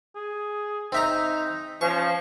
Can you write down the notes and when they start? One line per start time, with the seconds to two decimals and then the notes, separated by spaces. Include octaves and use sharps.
0.15 G#4
0.92 C4 D#4 E5 A#5
1.81 F3 C#4 C#6